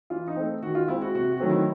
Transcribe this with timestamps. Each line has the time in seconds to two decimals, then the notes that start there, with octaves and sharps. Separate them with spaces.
0.10 E3 F4
0.27 D#4
0.36 A3 C4
0.62 D#3 F#4
0.75 F4
0.88 G#3 C4 E4
1.02 F#4
1.15 C3 F#4
1.32 F#4
1.40 D#3 F#3 A3 C4
1.49 E4